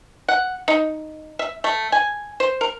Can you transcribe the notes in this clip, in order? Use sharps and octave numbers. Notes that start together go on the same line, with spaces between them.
F#5
D#4
E5
A3
G#5
C5
A#4